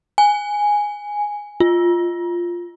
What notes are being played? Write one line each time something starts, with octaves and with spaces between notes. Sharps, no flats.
G#5
F4